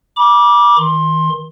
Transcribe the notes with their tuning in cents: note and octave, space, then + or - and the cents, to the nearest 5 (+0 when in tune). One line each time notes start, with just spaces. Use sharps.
B5 -35 D6 +0
D#3 +40 C6 +20